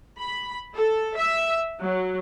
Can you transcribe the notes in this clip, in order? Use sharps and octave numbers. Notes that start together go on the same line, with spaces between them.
B5
A4
E5
F#3